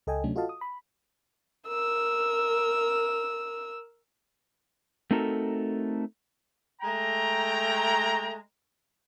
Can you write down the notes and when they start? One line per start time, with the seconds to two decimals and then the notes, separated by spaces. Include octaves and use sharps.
0.07 C#2 A4 D#5 G5 G#5
0.24 D2 C3 F#3 A3 C#4 D4
0.36 F4 F#4 A4 D#5 F5 A5
0.49 D#6
0.61 B5
1.68 A#4 E6
5.11 A3 C4 D#4 F#4 A4 A#4
6.82 G#3 A3 G5 A#5